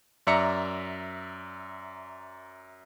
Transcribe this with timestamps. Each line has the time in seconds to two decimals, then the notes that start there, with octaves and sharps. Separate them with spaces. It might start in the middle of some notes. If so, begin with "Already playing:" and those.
0.27 F#2 D5 E5 A#5 C#7